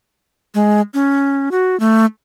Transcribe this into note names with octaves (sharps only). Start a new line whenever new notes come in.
G#3
C#4
F#4
A3